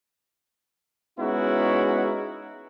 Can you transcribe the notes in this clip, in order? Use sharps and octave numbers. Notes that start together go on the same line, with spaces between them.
G#3 B3 C#4 D#4 E4 F#4